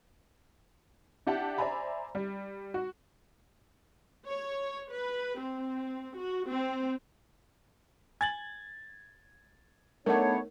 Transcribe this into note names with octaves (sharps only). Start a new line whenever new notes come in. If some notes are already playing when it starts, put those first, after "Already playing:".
D4 E4 G4 F#5 A5
C5 D5 E5 G#5 A#5 B5
G3
F#4
C#5
B4
C4
F#4
C4
G#5 G#6 A6 F#7
A3 B3 D4 D#4 A#4 C#5 F#5